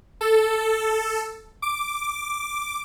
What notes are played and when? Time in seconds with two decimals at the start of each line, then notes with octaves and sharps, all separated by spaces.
0.21 A4
1.62 D6